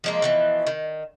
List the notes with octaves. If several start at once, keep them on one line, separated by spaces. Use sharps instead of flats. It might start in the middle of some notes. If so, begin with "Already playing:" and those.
F3 G#3 A#3
B2 E3 F3
D#3